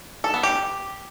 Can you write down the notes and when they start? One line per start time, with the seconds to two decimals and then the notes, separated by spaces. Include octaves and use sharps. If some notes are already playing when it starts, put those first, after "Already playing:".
0.24 A4
0.34 B3
0.43 G4